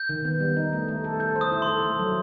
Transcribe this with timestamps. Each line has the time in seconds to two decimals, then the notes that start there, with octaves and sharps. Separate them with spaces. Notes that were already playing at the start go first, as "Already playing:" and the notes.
Already playing: G6
0.09 D#3
0.25 B3
0.40 G3
0.57 D#4
0.73 A3
0.88 A3
1.04 A4
1.20 A4 G6
1.36 C5
1.41 D#6
1.52 E4
1.62 C6
1.67 A4
1.83 A3
1.99 F#3